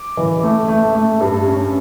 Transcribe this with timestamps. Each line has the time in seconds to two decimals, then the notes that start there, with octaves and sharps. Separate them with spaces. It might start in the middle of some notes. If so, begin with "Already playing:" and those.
Already playing: D6
0.17 E3
0.43 A3
0.68 A3
0.95 A3
1.21 G2
1.47 C#4